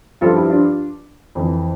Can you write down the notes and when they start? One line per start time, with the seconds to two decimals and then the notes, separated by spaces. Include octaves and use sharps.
0.21 G2 F3 F4 A4
0.35 E4 G4
0.49 D4 F4
1.35 F2 E3